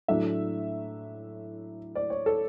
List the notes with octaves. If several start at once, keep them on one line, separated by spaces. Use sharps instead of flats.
A2 F#3 A3 D4 E5
D5
C#5
A4